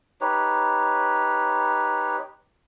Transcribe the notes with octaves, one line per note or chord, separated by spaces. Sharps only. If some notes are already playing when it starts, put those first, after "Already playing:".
D#4 G4 B4 C#5